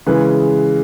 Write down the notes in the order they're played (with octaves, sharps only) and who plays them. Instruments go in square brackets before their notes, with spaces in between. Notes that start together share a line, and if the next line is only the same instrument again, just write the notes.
[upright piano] C#3 E3 G#3 B4